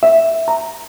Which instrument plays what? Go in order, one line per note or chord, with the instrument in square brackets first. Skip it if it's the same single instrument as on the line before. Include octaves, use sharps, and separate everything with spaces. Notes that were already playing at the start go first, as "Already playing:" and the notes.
[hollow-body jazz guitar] E5
A#5